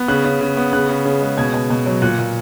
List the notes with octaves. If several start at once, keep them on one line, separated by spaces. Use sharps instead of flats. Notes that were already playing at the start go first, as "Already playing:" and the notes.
Already playing: B3
C#3 F#6
C#3
C#3
B3
C#3 F#6
C#3
C#3
G#3
B2 G#6
B2
B2
F#3
A#2 F#6
A#2